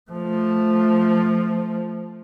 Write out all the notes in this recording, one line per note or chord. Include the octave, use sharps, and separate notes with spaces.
F3 A3